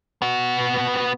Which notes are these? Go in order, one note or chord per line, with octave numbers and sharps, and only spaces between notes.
B3 F#4